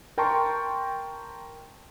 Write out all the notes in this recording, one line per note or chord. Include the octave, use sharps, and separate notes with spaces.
A#4 G5 A5 A#5 C6 C#6